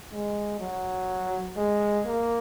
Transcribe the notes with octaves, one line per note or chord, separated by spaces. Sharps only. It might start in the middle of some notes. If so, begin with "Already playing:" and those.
G#3
F#3
G#3
A#3